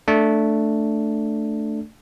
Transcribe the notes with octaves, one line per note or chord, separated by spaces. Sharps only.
A3 D4